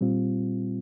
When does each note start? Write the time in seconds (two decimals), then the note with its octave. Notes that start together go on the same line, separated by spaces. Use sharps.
0.01 A#2 G3 C4 F4